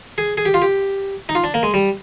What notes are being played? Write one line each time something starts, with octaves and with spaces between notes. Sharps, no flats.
G#4
G#4
G4
F4
G4
D#4
F4
D4
A#3
G#3
G3